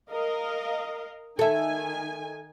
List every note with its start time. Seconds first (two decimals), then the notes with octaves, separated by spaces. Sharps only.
0.10 A#4 D#5 F5
1.39 D#3 A4 E5 G#5